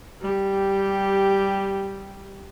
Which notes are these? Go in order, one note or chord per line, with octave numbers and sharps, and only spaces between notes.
G3 G4